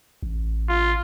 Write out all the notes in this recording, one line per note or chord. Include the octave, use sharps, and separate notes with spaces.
A1
F4